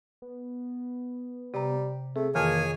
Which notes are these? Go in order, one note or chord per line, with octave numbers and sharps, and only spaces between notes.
B3
C3 G3 A#5
A3 C4 G#4
F2 D#3 E3 A#3 G#4 C#5 G#5 F6